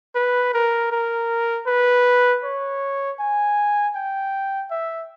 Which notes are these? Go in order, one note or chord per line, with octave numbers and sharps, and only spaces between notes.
B4
A#4
A#4
B4
C#5
G#5
G5
E5